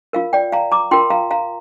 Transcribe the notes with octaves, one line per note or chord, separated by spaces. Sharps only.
F4 A#4 F5
D5 G5
F5 A#5
A#5 D6
F4 A#4 G5 C6
F5 A#5
F5 A#5